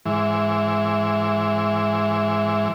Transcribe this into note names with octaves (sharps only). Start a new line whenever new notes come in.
G#2 E3